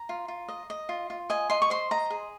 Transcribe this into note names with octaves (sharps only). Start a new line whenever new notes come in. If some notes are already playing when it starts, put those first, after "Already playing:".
Already playing: A#5
F4
F4
D#5
D#5
F4
F4
D#5 G#5
D#5 C6
C#6
C5 C6
D#5 A#5
G#4